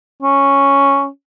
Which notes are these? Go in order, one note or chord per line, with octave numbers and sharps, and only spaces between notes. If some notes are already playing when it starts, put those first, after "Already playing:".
C#4